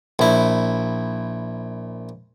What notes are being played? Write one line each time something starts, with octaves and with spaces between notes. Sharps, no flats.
A#1 E4